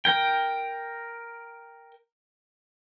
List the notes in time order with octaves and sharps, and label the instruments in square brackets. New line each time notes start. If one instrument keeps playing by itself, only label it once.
[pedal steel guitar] A#4 G5